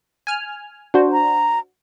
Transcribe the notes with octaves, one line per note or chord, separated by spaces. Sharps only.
G#5 F6
D4 F#4 C5
A#5